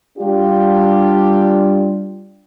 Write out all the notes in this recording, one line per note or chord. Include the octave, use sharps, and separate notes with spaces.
G3 D4 F4 G4